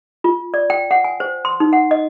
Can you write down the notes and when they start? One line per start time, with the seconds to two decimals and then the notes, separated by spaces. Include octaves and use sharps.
0.24 F4
0.54 D5
0.70 G5
0.91 F#5
1.04 G#5
1.20 C5
1.45 C6
1.60 D#4
1.73 F#5
1.91 D#5